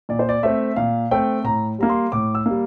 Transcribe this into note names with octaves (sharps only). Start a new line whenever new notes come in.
A#2 D5
C5
D5
A3 C4 E5
A#2 F5
A3 C4 G5
A2 A#5
G3 A#3 A#5
C6
A2 D6
E6
G3 A#3